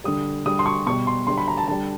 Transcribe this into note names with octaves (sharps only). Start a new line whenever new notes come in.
D3 G3 D#6
D3 G3 D#6
C6
C#6
B2 G3 C#6
C6
D3 G3 C6
B5
A#5
A5
D3 G3 A5